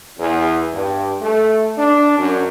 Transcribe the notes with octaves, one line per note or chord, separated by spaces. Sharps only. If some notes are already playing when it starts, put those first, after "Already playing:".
E2
G2
A3
D4
F#2